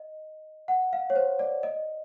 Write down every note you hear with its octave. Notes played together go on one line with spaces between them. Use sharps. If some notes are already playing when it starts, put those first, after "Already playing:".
Already playing: D#5
F#5
F5
C#5
C5
D5
D#5